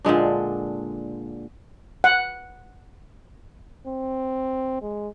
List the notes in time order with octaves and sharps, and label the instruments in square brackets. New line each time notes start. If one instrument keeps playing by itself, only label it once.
[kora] A#2 D3 G#3 D4
[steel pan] F#5
[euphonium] C4
G#3